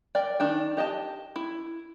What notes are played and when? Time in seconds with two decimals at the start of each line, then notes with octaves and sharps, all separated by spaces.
0.15 A#4 D5 G5
0.40 D#3 D4 G5
0.77 G4 D#5 G5 A5
1.36 E4